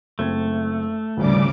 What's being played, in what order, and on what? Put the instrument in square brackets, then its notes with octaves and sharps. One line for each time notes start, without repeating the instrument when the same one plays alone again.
[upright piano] F#1 C4 G#6 [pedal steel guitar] A3
[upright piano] D#1 G#1 D2 [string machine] C#3 D6 [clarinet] G3